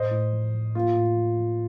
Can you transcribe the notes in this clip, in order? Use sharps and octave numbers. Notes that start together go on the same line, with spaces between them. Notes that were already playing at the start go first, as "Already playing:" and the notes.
Already playing: A2 C5 D#5
A2
F3
F3
A#3 F4
A2
F3
F3